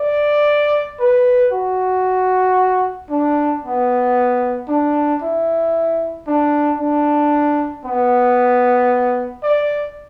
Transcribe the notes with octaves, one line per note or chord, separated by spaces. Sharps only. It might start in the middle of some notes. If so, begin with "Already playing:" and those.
Already playing: D5
B4
F#4
D4
B3
D4
E4
D4
D4
B3
D5